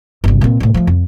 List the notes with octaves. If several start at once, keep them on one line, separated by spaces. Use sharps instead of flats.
G1 C2
A#2 C4
D2 A2
F3 A3
F2